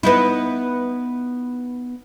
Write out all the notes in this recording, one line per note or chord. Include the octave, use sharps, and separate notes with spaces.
B3 D#4 E4